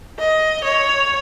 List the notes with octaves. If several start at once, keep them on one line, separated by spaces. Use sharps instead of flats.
D#5
C#5